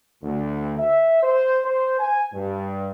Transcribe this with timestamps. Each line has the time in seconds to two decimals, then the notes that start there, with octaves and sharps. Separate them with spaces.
0.22 D2
0.77 E5
1.23 C5
1.64 C5
1.99 G#5
2.33 G2